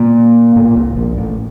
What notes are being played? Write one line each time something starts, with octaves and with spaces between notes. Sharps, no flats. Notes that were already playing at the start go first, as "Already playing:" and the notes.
Already playing: A#2 A#3
A2
A#2
C2 C3
A#1 A#2
A1 A2